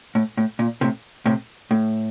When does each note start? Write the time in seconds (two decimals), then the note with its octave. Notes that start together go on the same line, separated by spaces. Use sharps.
0.15 A2
0.37 A2
0.59 A#2
0.81 A2 C3
1.26 A2 C3
1.71 A2